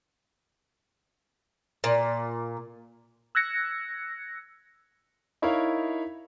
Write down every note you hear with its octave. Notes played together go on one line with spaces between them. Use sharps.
A#2
E6 F#6 G#6 A#6 C#7
D#4 E4 A#4 C#5 F5